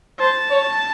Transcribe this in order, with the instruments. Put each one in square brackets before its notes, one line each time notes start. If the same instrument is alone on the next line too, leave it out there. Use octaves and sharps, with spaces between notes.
[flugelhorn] C5 [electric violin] A5
[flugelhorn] C#5